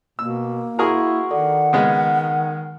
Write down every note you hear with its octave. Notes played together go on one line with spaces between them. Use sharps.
B2 A#3 E6
E4 F#4 G#4 A#4 F#5 C#6
D#3 A4 D5 F#5
C#3 G#3 B3 F6